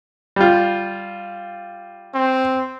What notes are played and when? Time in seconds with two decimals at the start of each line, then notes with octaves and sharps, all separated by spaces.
0.36 G3 F4
2.14 C4